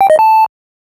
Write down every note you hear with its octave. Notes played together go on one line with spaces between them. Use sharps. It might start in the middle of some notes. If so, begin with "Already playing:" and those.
G5
D#5
A5